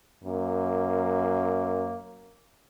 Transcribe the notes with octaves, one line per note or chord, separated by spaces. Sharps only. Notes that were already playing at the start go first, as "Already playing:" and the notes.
F#2 A#3